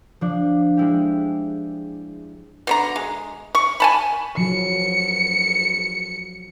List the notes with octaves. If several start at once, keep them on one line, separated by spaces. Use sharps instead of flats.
F3 D4
G#3 E4 G4
B2 D3 A#5
G#3
C#6
G#5 A5 B5
F3 F#3 C#7